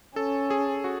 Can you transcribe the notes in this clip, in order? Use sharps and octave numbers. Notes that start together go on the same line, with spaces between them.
C#4 A4
G#4
F#4